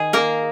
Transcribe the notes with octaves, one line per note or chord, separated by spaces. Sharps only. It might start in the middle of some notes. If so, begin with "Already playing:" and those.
Already playing: D#3 G#4
A#3 A#4